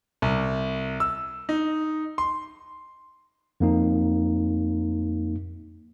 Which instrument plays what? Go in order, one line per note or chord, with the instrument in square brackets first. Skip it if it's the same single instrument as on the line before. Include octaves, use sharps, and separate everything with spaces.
[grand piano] C2
E6
D#4
C6
[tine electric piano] F2 A#3 D#4